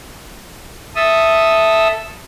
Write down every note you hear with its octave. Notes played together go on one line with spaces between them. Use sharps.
A4 E5 D#6 E6